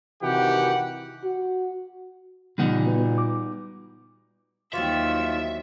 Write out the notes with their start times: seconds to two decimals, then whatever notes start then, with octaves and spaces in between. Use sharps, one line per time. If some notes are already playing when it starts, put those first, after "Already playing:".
0.23 C3 D#3 E3 F#4 G4 F#5
1.24 F#4
2.58 A#2 C#3 E3 G3 B3 D#4 F#5
2.86 B3 F#4 B4
3.18 D6
4.73 D#2 E3 F#3 C4 F4 E5 E6